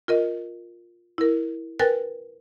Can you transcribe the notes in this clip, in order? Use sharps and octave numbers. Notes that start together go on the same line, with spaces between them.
F4 A#4 D#5
E4 A#4
A#4 B4 G5 G#5 F#6 A6